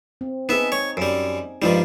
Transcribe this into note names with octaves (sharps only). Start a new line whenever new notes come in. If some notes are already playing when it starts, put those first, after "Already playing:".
C4
B3 D#4 G#4 E5
C#5
F#2 G3
G2 F3 G3 G#3 D#4 F4